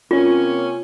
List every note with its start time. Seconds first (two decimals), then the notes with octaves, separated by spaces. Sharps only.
0.11 C3 A#3 C#4 F4